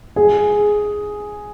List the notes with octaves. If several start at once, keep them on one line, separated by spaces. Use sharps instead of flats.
G#4